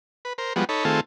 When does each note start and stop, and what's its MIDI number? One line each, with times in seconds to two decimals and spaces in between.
0.25 0.33 71
0.38 0.53 70
0.38 0.53 72
0.56 0.65 53
0.56 0.65 55
0.56 0.65 56
0.56 0.65 59
0.56 0.65 66
0.69 0.85 63
0.69 0.85 69
0.69 0.85 73
0.69 0.85 83
0.85 1.00 51
0.85 1.00 57
0.85 1.00 60
0.85 1.00 65
0.85 1.00 68
0.85 1.00 69